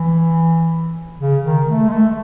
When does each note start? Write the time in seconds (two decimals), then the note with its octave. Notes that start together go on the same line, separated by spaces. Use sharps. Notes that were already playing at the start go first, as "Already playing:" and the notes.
Already playing: E3
1.20 C#3
1.45 D#3
1.68 A3
1.88 G#3
1.92 A3